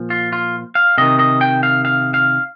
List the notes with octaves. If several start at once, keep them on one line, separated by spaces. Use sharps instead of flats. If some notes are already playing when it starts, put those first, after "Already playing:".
Already playing: A#2 F3
F4
F4
F5
C3 D#3 D#5
D#5
G5
F5
F5
F5